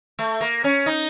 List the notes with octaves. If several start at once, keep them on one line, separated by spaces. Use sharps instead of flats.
A3
A#3
C#4
D#4